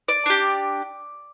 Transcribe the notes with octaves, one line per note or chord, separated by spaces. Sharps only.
D5
D4 G4